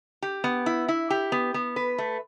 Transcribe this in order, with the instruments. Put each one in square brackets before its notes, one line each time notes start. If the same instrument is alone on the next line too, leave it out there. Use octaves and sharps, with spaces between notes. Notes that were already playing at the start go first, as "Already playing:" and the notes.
[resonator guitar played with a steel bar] G4
B3
E4
E4
G4
B3
B3
B4
A3